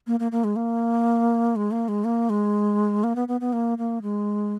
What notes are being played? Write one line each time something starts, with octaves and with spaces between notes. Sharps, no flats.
A#3
A#3
A#3
G#3
A#3
G#3
A#3
G#3
A#3
G#3
A#3
B3
B3
B3
A#3
A#3
G#3